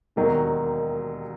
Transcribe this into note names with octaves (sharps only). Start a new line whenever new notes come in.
E1 D#2 D#3 F#3